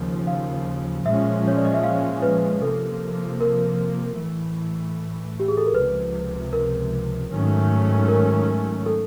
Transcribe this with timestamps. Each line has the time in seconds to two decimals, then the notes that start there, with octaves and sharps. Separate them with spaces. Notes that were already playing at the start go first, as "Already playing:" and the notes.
Already playing: D#2 C#3 F3
0.27 F5
1.05 A#2 F3 G#3 C#4 E5
1.48 C#5
1.57 D5
1.65 D#5
1.74 E5
1.83 F5
2.22 B4
2.61 C3 F3 A#3 A4
3.41 A#4
4.18 A2 E3 A3
5.40 G4
5.48 G#4
5.57 A4
5.66 A#4
5.74 C#2 C3 F3 B4
6.53 A#4
7.31 G#2 D#3 F#3 A3 C#4
8.08 A#4
8.86 A4